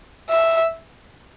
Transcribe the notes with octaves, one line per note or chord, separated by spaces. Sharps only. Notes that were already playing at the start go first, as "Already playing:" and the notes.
E5